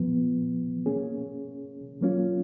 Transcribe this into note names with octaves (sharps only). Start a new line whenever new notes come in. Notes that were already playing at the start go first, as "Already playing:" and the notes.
Already playing: A#2 F3 B3
A#3 C#4 G#4
F#3 A#3 C#4 F4